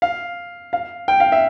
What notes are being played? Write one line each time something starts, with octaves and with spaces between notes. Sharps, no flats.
F5
F5
G5
F5
E5